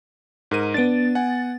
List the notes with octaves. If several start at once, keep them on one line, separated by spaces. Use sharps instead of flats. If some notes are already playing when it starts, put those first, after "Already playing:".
G#2 A#4 D#7
B3 D4 A6 D7
F#5 G#5